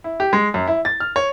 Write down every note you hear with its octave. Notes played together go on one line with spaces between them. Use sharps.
E4
G4
G#3
F#2
E4
A6
F6
C#5